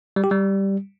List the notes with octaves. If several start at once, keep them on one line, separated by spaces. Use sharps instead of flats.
G3
G4
G3